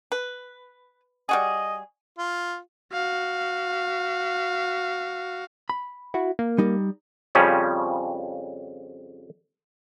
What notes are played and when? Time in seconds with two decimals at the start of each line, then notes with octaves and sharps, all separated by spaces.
0.12 B4
1.29 G3 F#4 G#4 D#5
2.18 F4
2.92 F#4 F5
5.70 B5
6.14 E4 F#4
6.39 A#3
6.58 G3 D#4
7.35 F2 C#3 F3 G3 C#4